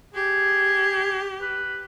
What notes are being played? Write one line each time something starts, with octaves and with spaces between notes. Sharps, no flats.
G4 G#4
B4